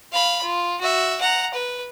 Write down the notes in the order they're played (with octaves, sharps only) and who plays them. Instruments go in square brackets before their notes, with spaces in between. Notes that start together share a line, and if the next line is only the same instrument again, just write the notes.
[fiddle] F5 B5
F4
F#4 E5
F#5 A#5
B4